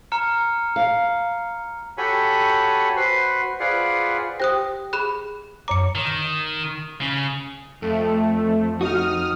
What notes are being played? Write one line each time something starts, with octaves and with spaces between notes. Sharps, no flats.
A#5 F6 C#7
F5
F#4 G4 A4 C#5 G#5 B5
F#4 B4 C5
F4 G#4 B4 C5 D5 F#5
G4 C5 G5 D#6 F#6 A#6
G#4 B5 F#6
F#2 C#5 A#5 D6 C#7
D#3
C#3
F2 A3
D#4 F#4 D#6 F6